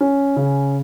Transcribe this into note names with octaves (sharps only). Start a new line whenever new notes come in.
C#4
C#3